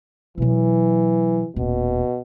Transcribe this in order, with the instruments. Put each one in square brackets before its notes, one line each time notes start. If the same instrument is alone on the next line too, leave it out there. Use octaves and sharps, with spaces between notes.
[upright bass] B2 F#3 [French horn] E3
[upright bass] D#1 [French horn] B2